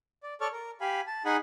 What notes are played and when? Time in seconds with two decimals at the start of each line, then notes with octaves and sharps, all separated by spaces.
0.23 D5
0.41 A4 C#5 D5 C#6 F6
0.52 A#4
0.81 G4 F5 G#5 B5
1.07 A5
1.25 D#4 G#4 F#5 G#5 B5